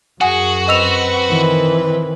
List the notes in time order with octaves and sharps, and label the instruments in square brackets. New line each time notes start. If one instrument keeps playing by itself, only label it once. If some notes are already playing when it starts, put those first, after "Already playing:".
[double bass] F#2 [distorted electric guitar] F#4 [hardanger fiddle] G#4 [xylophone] F#5 G#5 D#6
[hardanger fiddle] C4 B4 [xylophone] D#5 E6 F7
[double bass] D#3 E3